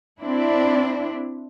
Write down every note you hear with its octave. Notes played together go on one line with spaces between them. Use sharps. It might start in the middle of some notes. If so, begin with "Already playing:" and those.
C4 D4 E4